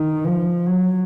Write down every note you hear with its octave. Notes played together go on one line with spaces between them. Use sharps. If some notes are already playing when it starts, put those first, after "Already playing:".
Already playing: D#3
F3
F#3